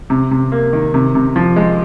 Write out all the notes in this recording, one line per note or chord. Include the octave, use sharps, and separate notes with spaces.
C3
C3
A#3
D#3
C3
C3
F3
G#3